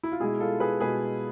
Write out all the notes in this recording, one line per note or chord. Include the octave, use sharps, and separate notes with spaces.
E4
F4
B2 G#3 E4 G#4
F4 A4
G#4 B4
B2 G#3 G#4 B4